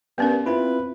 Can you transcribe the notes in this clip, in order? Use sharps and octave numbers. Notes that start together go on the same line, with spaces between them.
G2 B3 C#4 A#4
C4 E4 F4 B4